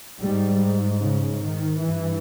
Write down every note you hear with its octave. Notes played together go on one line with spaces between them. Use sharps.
G#2 G3
C#3
D#3
G2 E3